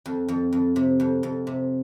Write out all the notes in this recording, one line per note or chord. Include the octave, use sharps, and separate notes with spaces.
F2
F2
F2
C3
F2
F2
C3